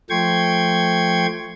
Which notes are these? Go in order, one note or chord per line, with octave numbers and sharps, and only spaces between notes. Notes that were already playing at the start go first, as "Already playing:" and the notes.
F3 A3 G5 C6 C#6 G#6